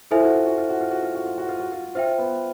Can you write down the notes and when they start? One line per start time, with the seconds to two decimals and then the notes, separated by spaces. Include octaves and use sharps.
0.11 E4 F4 A4 C5 E5 G#5
0.22 F#4
0.35 F4
0.46 F#4
0.58 F4
0.69 F#4
0.81 F4
0.91 F#4
1.03 F4
1.15 F#4
1.25 F4
1.38 F#4
1.48 F4
1.60 F#4
1.72 F4
1.95 F4 C5 E5 G5
2.18 B3